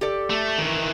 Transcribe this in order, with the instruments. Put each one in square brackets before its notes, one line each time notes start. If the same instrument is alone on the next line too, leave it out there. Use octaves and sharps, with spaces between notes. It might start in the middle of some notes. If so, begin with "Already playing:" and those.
[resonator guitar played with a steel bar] G4 A4 D5
[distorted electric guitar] A3
D#3 E3